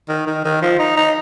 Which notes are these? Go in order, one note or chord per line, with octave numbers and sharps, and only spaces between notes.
D#3
D#3
D#3
F3
D#4
D#4